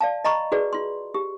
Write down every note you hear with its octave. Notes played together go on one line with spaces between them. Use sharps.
D5 F5 A5
D#5 A#5 B5 C#6
F#4 G#4 B4 D5
F4 C6
G4